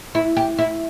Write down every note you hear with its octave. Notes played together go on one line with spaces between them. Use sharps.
E4
G4
E4